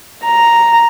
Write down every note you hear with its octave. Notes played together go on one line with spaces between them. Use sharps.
A#5